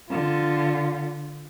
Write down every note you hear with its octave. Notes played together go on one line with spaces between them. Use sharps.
D3 F4